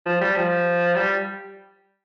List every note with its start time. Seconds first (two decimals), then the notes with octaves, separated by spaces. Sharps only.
0.06 F3
0.21 G3
0.36 F3
0.96 G3